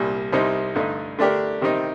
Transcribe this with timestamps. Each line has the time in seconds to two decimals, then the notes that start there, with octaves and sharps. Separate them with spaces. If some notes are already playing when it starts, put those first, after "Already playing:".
Already playing: C2 A#2 G3
0.32 C2 C3 G3 C4 D#4
0.75 G2 D3 A3 D#4
1.19 D3 A3 D4 G4 A#4
1.61 C3 D#3 G3 C4 D#4